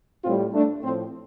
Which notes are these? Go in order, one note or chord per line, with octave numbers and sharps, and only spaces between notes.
A2 G3 C4 F4
A3 D4
A2 F3 C4